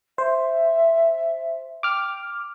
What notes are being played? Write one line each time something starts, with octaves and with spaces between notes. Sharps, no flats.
C5 E5
G5 D6 F6